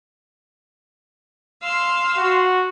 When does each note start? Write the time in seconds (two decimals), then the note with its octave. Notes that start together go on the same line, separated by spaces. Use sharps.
1.62 F5 C6 E6
2.18 F#4